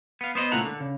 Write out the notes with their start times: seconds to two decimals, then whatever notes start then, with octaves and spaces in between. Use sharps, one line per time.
0.21 B3 F5
0.35 B3 C5 C#5 D#5
0.52 C#2 A#2 A3 E4 F#5 A#5
0.65 D3
0.80 C#3